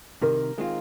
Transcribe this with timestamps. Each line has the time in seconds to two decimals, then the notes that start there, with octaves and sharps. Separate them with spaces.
0.22 C2 C3 D#3 A#4
0.58 D#3 G#3 C4 F4